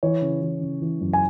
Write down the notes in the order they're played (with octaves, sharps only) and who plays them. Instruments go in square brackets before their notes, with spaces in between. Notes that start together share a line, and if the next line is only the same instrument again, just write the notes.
[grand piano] E3 C#5
C#3
E3
C#3
E3
F#2
G#5